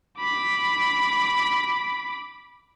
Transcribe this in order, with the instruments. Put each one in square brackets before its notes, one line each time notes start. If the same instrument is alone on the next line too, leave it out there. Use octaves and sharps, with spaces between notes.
[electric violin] B5 D6